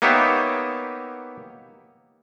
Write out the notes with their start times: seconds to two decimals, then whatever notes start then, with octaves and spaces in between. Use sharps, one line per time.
0.02 A#3 B3 D#4 G4 C#5 E5